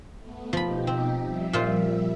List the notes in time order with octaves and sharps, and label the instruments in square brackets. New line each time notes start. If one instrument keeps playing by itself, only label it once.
[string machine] A3 B3
[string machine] B2 D#4 G4 [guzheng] F3 B5
[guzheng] C4
[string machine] F3 G3 E5
[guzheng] A#2 F4 C5